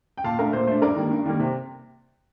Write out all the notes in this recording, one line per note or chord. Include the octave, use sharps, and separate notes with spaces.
G5
A#2 F5 A5
A3 D4 A#4
A#2 C5
A3 D4 C5
G2 A#4 D5
D#3 G3 A#3
G2
D#3 G3 A#3
C3